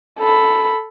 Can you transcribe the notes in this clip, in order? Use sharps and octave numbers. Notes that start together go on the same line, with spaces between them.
A4 B5